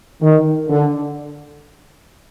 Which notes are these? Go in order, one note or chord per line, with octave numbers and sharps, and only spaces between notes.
D#3
D3